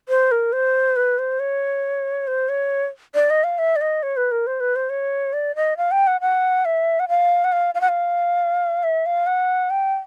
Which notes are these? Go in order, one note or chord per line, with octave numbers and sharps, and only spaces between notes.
C5
A#4
C5
B4
C5
C#5
C5
C#5
D5
D#5
F5
E5
D5
D#5
C#5
B4
A#4
C5
B4
C5
C#5
D5
D#5
F5
G5
F#5
F#5
E5
F#5
F5
F#5
F5
F5
F#5
F5
E5
F5
F#5
G5